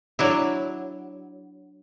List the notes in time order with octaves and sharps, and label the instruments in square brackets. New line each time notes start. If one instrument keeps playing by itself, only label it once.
[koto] F#3 D4 E4